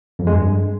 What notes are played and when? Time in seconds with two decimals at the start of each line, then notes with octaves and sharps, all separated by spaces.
0.19 F2
0.27 G#3
0.35 G2